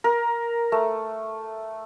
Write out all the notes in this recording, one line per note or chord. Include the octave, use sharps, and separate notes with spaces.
A#4
A3